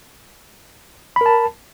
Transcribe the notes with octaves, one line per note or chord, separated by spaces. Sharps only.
A#4 A5 B5